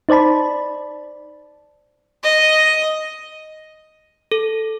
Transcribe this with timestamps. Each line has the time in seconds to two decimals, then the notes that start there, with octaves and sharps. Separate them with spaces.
0.09 D#4 C5 D5 A5 B5
2.24 D#5
4.32 A4